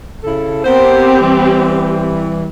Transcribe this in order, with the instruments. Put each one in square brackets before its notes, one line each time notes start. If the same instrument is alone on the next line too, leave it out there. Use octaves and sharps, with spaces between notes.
[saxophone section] C#3 E4 A4
[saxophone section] B3 A#4 C5 [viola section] C4 G4
[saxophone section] E3 G3